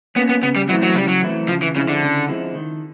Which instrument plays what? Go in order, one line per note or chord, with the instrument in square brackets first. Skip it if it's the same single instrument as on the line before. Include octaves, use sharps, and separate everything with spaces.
[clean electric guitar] A#3 C#4 [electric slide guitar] B3
[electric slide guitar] B3
[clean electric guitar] C#3 [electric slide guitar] B3
[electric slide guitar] G3
[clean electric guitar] E3 A3 C4 E4 [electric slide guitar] F#3
[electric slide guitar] F#3
[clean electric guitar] C#3 [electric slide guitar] G3
[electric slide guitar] F#3
[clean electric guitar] E3 A3 C4 E4
[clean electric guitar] C#3 [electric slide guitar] F3
[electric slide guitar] E3
[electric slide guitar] C#3 [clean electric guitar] F3 G#3 C4 E4
[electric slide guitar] D3
[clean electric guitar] C#3
F3 G#3 C4 E4
D#3